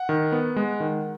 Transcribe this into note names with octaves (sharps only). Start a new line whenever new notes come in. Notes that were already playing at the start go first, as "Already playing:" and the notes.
Already playing: F#5
D#3
B3
G#3
D#3